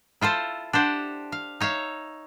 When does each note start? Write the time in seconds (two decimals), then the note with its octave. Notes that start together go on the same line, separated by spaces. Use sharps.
0.21 E4 F4 A4 C5
0.73 D4 G4 C5 F#5
1.32 F5
1.60 D#4 C#5 E5 F5